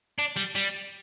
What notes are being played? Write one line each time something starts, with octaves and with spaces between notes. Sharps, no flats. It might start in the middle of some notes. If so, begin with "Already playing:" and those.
D4
G3
G3